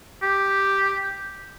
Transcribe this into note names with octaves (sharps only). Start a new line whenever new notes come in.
G4